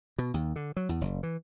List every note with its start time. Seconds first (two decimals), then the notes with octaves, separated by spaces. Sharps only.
0.18 B2
0.34 D#2
0.56 D3
0.77 F#3
0.89 E2
1.01 F#1
1.23 E3